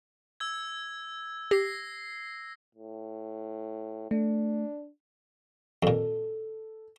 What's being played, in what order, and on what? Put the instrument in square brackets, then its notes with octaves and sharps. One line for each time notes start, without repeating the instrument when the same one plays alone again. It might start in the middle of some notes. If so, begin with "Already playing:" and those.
[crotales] E6 G#6
[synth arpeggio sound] G4 [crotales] A#6 C7
[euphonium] A2
[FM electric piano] A3 [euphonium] D4
[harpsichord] F2 A#2 [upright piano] A4